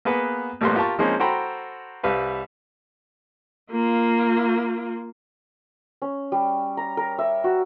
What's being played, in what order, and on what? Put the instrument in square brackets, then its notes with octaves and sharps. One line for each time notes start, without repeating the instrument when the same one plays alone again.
[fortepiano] A#3 B3 G#4 B4 F#5
A1 A2 G3 A#3 B3 C6
F4 G4 A#4 A5 C#6
F3 G#3 A#3 C4 C#4 D#4
F#4 A4 C5 G5 A#5 B5
C2 G3 B4 F5
[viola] A#3 F4
[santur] C#4
G3
A#5
A#4
E5
F#4